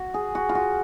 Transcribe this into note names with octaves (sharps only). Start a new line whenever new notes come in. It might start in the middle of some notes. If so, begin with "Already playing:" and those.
Already playing: F#4
G#4
F#4
F4
F#4